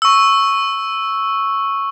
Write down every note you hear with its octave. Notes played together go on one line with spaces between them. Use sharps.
C#6 E6